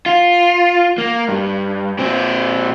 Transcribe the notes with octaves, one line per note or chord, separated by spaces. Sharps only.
F4
A#3
G2
A#2 C4